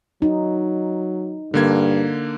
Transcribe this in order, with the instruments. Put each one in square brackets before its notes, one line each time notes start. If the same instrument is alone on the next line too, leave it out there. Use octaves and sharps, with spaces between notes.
[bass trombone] F#3 [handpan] D#4
[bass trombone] G2 [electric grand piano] D3 A#3 G#6